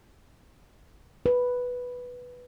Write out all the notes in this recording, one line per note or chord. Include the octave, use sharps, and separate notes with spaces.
B4